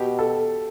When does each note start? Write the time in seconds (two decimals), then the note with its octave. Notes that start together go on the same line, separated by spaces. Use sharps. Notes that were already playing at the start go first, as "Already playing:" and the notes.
Already playing: B2 G4
0.19 A4